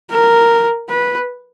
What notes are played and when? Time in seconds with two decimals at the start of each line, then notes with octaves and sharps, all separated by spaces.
0.11 A#4
0.89 B4